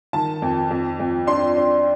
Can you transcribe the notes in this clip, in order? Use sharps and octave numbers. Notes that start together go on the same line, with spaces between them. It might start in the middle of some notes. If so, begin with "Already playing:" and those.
D#3 A5
F2
F2
F2
D4 C6
D4